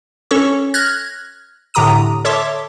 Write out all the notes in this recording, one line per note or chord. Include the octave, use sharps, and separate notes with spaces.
C#4 A4 C#5 C#6
F6 F#6 G#6 A#6
A2 D3 G4 A#5 D#6 D#7
A4 C#5 E5 A5 C6 D6